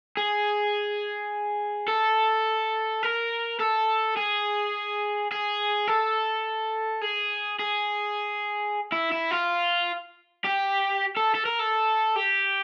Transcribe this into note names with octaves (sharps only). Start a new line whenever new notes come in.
G#4
A4
A#4
A4
G#4
G#4
A4
G#4
G#4
E4
E4
F4
G4
A4
A4
A#4
A4
G4